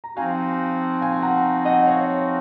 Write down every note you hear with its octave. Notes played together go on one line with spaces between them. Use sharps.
A#5
F3 C4 D#4 F#4 F5 G#5
F5 G#5
F#5 A#5
D#5 F#5
C#5 F5